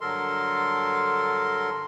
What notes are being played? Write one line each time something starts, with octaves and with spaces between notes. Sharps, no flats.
G2 D3 F#3 A4 A#4 C6